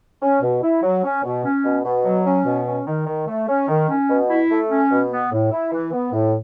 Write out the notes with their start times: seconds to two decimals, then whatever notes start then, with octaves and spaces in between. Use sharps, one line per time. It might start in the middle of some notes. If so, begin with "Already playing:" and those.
0.22 C#4
0.42 B2
0.62 E4
0.83 F#3
1.03 C#4
1.23 B2
1.44 C#4
1.64 B2
1.84 B2
2.05 F#3
2.25 C#4
2.45 B2
2.66 C#4
2.86 D#3
3.07 D#3
3.27 A3
3.48 C#4
3.68 D#3
3.88 C#4
4.09 B2
4.29 E4
4.50 A3
4.70 C#4
4.90 B2
5.11 B3
5.32 A2
5.51 E4
5.72 E3
5.92 B3
6.12 A2